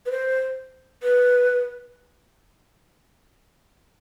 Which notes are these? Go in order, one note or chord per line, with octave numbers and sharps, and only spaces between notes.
B4
C5
B4